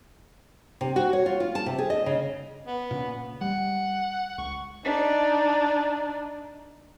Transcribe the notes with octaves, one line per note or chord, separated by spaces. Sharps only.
C3
F#4
C#5
F4
F4
A5
C3
G#4
D#5
C#3
B3
A#2 C#3
G3 F#5
C#2 C#6
D4 D#4